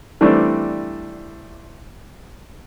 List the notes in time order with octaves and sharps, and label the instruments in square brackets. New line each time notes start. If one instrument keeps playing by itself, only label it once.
[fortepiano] E3 G3 A3 C4 D4